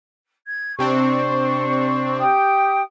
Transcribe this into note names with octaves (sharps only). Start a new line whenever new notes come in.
G#6
C3 C4 D4 C5 C#6
G4 G5 D#6